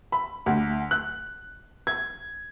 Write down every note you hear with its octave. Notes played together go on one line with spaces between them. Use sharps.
B5
D2
F#6
G#6